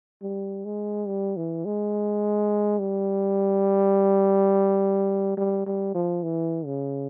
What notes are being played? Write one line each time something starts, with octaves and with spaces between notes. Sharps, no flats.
G3
G#3
G3
E3
G#3
G3
G3
G3
F3
E3
C#3